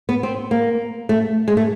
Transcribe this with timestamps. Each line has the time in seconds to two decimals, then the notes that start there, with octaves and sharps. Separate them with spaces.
0.09 B3
0.23 C4
0.51 A#3
1.09 A3
1.48 G#3
1.57 A3